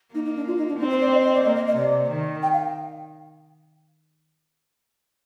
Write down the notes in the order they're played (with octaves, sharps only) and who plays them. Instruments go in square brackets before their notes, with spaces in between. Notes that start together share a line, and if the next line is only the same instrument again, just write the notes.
[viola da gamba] A#3 [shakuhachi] D#4
[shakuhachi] D#4
D4
F4
D#4
D4
[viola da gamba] C4 [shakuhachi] D#4
[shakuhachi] C5
D5
D#5
D#5
D5
[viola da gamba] A#3 [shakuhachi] D#5
[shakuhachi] D#5
D#5
[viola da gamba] C3 [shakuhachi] D5
[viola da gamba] D#3
[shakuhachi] G5
F5